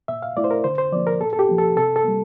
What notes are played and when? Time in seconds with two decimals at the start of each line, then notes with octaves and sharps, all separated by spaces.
0.08 A#2 E5
0.22 F5
0.37 A3 E4 D5
0.44 C5
0.51 A#4
0.64 D3 C5
0.78 C5
0.92 F3 A#3 D5
1.07 A#4
1.20 A#2 A4
1.33 A4
1.39 G4
1.49 F3 A#3
1.58 A4
1.76 C3 A4
1.96 A4
2.04 G3 A#3